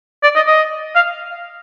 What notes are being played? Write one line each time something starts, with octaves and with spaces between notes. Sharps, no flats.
D5
D#5
D#5
F5